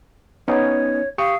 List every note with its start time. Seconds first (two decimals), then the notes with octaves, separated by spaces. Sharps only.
0.48 B3 C#4 D#4 C#5
1.18 G4 F5 C#6 D#6